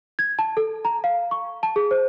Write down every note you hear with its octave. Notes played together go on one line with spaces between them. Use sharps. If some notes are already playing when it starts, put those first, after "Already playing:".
G#6
A5
A4
A#5
F5
C#6
A5
G#4
C5